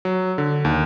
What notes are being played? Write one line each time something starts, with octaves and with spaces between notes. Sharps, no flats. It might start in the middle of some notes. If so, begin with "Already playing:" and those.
F#3
D3
D#2